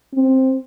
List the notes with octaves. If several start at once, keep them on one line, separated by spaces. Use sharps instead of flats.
C4